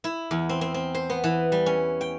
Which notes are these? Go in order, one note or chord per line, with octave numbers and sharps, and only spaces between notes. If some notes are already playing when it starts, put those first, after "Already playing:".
E4
E2
C4
C4
C4
C5
B3
E3
G3
C#4
G5